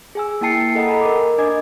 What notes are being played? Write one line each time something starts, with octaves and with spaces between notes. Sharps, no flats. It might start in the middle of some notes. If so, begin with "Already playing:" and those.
G#4 G#5 E6
A#3 E4 G5 A5 C7 C#7
A4 D#5 F#5 A#5 B5
G#5 A#5 B5
A#4 D6
D4 D#5 G#5 D6 G#6